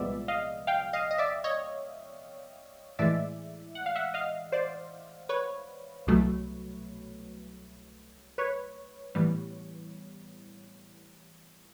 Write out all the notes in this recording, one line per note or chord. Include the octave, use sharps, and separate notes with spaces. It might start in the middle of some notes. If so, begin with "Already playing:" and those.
Already playing: C2 A#2 F3 G#3 B3 D5 E5
D#5 F5
F5 G5
D#5 F5
D#5
D5 E5
C#5 D#5
A2 E3 G#3 D5 E5
F#5
F5
E5 F#5
D#5 F5
C5 D5
B4 C#5
C2 B2 F#3 A3
B4 C#5
A2 E3 G3 B3